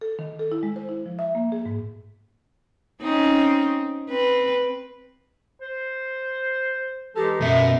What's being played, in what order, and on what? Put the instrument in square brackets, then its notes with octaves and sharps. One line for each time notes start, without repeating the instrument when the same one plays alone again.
[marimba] A4
D#3
A4
E4
G#3
C5
E4
F3
E5
A#3
G#4
G#2
[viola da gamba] C4 C#4 D#4
C4 B4
[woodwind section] C5
[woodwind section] E3 G#3 D#4 [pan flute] G4 [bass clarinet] A4
[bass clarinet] F#2 [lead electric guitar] B2 [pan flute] E5